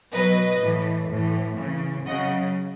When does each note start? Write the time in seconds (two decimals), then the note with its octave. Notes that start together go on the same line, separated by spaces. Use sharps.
0.13 B2 F#3 B4 D#5
0.61 A2 E3
1.10 A2 E3
1.58 C#3 E3
2.06 C#3 F#3 D#5 F#5